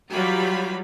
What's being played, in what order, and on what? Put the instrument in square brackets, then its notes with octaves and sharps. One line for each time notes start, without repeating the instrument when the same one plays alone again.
[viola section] E3 F#3 G3 F4 G4 B5